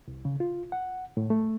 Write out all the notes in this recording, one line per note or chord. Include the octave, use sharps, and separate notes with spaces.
C2
C#3
F4
F#5
A2
A3